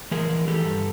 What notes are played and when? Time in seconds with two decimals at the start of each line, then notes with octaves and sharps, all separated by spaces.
0.11 E3 G#4 A#4
0.30 E3
0.47 E3 G4 A4
0.65 G2